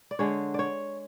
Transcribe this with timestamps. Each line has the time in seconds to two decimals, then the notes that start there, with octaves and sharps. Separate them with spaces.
0.11 D5
0.19 D3 G#3 C#5
0.54 C#5 D5